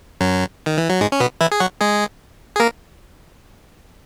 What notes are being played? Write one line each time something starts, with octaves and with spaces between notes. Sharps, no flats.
F#2 F#3
D#3
E3
F#3
G#2 G#3
C#4
B2 B3
E3 E4
G#4
F#3 F#4
G#3 G#4
G#4
A#3 A#4